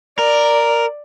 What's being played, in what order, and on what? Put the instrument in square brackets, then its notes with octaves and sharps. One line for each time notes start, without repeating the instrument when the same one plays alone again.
[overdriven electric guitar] A#4 [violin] D5